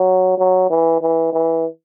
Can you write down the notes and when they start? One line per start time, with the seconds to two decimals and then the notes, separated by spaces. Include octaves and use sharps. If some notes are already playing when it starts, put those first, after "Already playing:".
Already playing: F#3
0.38 F#3
0.70 E3
1.01 E3
1.33 E3